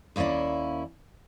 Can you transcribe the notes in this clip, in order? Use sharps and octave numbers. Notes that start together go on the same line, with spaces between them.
D#2 A#3 C#4 E4 D5